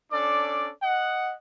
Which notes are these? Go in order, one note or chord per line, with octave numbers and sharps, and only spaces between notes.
C#4 D4 A4 D5 D6
D#5 F#5